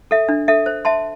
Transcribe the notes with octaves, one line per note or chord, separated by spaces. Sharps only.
A4 E5
D4
A4 E5
C5
E5 A5 C6